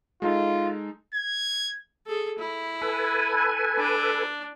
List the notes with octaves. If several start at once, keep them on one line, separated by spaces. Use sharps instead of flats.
G#3 D#4 F4 A4
G#6
G#4 A4
E4
A4 B4 G#5
D4